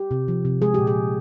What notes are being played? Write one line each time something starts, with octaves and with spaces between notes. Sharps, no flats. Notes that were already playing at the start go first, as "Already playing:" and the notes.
Already playing: G4
C3
F3
C3
G#3 G#4
A#2 G4
G#4
F3